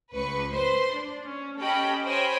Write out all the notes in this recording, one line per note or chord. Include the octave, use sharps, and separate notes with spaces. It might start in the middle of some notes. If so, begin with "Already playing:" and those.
C#2 B4 C#6
B4 C5 C6
D4
C#4
C#4 G4 A4 D#5 G5 B5
C5 C#5 D#5 G5 G#5 B5